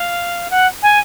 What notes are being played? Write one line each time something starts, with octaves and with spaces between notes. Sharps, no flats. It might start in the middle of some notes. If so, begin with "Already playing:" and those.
Already playing: F5
F#5
G#5